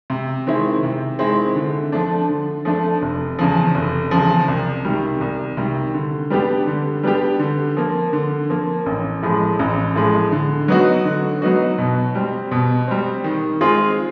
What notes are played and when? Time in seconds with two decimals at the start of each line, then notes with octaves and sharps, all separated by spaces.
0.10 C3
0.47 D#3 G#3 C4 E4
0.83 C3
1.19 D#3 G#3 C4 E4
1.56 D3
1.92 F3 A3 D4
2.29 D3
2.65 F3 A3 D4
3.02 F1
3.39 E2 C#3 F3
3.75 F1
4.11 E2 C#3 F3
4.48 C2
4.85 C3 D#3 G3
5.21 C2
5.57 C3 D#3 G3
5.94 D3
6.30 G3 B3 D4 G4
6.67 D3
7.03 G3 B3 D4 G4
7.39 D3
7.76 F3 A#3
8.13 D3
8.50 F3 A#3
8.86 A1
9.23 A2 F3 G#3
9.59 A1
9.96 A2 F3 G#3
10.32 D3
10.68 F#3 B3 D#4 F#4
11.05 D3
11.42 F#3 B3 D#4 F#4
11.78 B2
12.15 G3 C4
12.51 B2
12.88 G3 C4
13.24 D#3
13.61 G#3 C4 F4 G#4